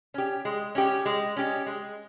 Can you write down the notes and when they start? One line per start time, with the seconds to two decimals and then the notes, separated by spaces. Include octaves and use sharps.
0.14 C#4 G4
0.45 G#3
0.75 C#4 G4
1.06 G#3
1.36 C#4 G4
1.66 G#3